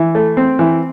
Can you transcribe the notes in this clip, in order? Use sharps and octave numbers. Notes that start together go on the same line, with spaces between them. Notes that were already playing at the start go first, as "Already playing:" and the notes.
Already playing: E3
A3
C4
E3